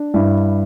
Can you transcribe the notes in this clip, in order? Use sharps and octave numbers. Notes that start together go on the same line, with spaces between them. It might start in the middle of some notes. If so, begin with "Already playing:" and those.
Already playing: D4
G2 E4